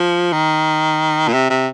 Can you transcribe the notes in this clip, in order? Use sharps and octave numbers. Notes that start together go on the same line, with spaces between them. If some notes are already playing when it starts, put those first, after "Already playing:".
Already playing: F3
D#3
A#2
C3
C3